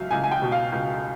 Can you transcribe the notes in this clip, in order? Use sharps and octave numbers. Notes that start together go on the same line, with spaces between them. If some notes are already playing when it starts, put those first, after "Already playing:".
Already playing: C#2 F#3 E5 F5
C#2 G#5
G#5
G5
B2
F5
C#2